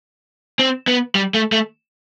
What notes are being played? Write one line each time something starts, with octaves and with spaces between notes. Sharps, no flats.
C4
B3
G3
A3
A3